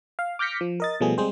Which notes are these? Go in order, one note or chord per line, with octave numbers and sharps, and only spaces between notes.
F5
D6 F6 G6 A#6 B6 C#7
F3
A#4 D#5 A6
B2 F3 G3 A3 B3 G#4
G3 G#3 C4 G#4 C5